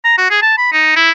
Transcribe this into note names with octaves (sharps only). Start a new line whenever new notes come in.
A#5
F#4
G#4
A5
B5
D#4
E4